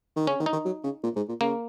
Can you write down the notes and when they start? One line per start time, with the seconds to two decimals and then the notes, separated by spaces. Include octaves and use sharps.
0.16 D#3
0.27 C#3 C#4
0.40 D#3
0.46 D#4
0.53 D#3
0.65 F#3
0.84 C#3
1.04 A#2
1.16 G#2
1.28 A#2
1.41 C#3 A#3